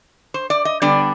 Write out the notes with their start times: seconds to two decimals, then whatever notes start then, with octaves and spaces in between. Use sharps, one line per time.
0.34 C5
0.50 D5
0.65 D#5
0.82 D3 G3 B3 D4 D5